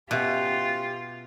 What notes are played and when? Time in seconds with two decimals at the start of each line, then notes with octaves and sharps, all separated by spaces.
0.11 B2 C#4 F4 G4 E5 G#5